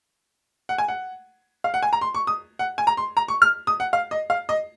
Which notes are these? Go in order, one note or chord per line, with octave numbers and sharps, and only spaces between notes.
F#5
G#5
F#5
F5
F#5
G#5
A#5
C6
C#6
D#6
F#5
G#5
A#5
C6
A#5
C#6
F6
D#6
F#5
F5
D#5
F5
D#5